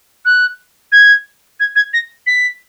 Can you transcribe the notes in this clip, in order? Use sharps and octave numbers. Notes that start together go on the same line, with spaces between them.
F#6
G#6
G#6
G#6
A#6
B6